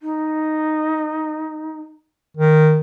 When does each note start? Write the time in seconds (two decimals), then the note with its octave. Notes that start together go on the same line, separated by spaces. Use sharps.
0.01 D#4
2.37 D#3